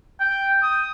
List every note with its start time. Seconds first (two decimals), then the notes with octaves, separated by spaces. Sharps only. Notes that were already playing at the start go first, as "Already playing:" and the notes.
0.20 G5
0.63 D#6